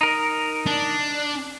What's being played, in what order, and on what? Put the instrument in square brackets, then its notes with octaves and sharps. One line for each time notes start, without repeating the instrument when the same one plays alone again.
[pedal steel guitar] D#4 A#4
[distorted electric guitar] D4